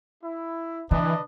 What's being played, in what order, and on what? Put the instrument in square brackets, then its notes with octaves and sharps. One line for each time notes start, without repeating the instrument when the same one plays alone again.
[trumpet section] E4
[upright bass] D3 [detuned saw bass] E3 [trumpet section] D4 B4 D#5